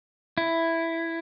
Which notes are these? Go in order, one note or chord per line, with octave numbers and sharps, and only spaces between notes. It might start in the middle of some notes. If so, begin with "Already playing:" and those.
E4